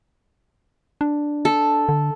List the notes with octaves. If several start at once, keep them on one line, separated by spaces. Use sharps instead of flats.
D4
A4
D3